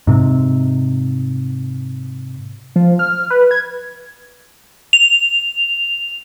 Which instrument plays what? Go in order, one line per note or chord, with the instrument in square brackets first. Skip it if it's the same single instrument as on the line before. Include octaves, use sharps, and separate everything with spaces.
[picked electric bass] G#2 C3
[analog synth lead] F3
F6
B4
G#6
[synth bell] F7